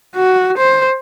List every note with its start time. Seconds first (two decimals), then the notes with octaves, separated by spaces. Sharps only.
0.16 F#4
0.58 C5